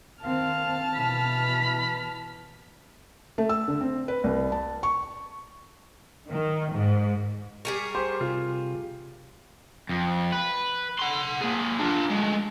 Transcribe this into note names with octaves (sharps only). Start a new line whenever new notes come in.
D#3 C4 F5 A5 F6
B2 E3 B5
A3
E6
D3
C4
B4
C2
A5
C#6
D#3
G#2
G3 G#4 A#4 C#6
G4 C5 C6
C3 F4
F2
B4
F#5 C6
A#3 G#4
D4 F4
G#3 A3